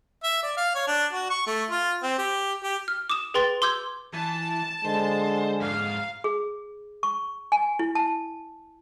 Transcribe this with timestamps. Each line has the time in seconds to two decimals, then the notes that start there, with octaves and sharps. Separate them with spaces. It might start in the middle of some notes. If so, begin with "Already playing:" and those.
0.24 E5
0.43 D5
0.57 F5
0.75 C#5
0.87 D4
1.13 F#4
1.30 C#6
1.47 A3
1.70 F4
2.03 C4
2.18 G4
2.64 G4
2.88 F6
3.10 D6 D#6 E7
3.34 G#4 B4 G5 C6 A6 G7
3.62 C6 D6 E6 G6 G#6
4.14 E3 A5
4.85 D3 G#3 C5
5.60 F2 G#2 F5
6.24 G#4
7.03 C#6
7.52 G#5
7.79 E4
7.95 A5